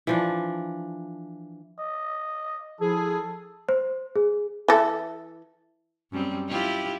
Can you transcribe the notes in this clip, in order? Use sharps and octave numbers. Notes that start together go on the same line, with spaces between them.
E3 F3 D4
D#5
F3 E4 G#4 A4
C5
G#4
E3 A4
F#2 G3 C4
E4 F4 G4